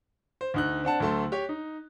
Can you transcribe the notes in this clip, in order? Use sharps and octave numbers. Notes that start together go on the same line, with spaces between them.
C5
D2 D#4 F#6
C4 D4 F#5 A5
D2 F#3 A3 A5 C6
G4 C#5
D#4